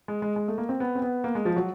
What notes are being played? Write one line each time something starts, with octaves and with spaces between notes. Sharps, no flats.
G#3
G#3
G#3
A3
A#3
C4
B3
C4
B3
A#3
G#3
F3
F#3